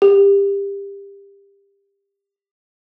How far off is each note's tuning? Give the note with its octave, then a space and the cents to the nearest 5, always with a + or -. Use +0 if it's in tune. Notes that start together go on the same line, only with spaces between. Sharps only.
G4 +25